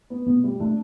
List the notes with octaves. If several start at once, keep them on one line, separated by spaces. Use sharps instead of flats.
B3
B2 B3
G3
A3 D4